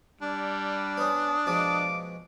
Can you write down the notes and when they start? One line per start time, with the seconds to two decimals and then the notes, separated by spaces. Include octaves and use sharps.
0.21 G3 D4
0.97 B3 C#4 D#6
1.46 B2 F3 G#3 F5 D6